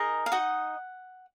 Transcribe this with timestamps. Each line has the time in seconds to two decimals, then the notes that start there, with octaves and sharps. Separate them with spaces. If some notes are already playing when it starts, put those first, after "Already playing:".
Already playing: D#4 G#4 A#4 D#5 A#5
0.26 F5
0.32 D#4 F#4 D#5 F#5